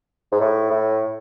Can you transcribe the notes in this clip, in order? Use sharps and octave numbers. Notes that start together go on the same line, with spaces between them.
G#2
A2
A2